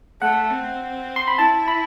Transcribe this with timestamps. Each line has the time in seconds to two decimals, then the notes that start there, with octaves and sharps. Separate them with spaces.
0.21 A3 F#5
0.50 C4
1.16 C6
1.28 B5
1.38 E4 A5
1.68 B5